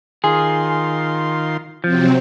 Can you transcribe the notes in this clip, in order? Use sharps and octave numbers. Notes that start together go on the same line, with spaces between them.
D#3 F4 G#4 C6
C3 F3 F#3 C4